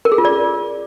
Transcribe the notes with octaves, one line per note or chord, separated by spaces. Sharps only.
A#4
G#4
F4
D5